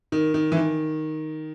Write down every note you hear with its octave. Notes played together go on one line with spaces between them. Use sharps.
D#3
D#3
E3
D#3